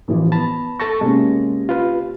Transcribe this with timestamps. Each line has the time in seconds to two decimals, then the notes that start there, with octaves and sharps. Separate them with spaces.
0.08 A1 E3 F3
0.32 B3 A5 B5
0.80 A4 A5 C#6 A#6
1.01 C3 G#3 A#3 C#4
1.69 F4 B4